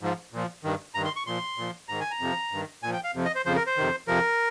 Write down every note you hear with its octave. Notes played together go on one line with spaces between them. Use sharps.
G#2 F3
A#2 F3
G2 D#3
G2 D#3 A#5
C6
C#6
A#2 F3 C6
A#2 F3
G#2 D#3 A#5
G#5
A#5
F2 C3 F3
G2 D#3
A#2 F3 G#5
G5
F5
F2 C3 F3
D#5
C5
F2 C#3 F3 C5
A#4
C5
F2 C3 D#3
F2 C3 F3 A#4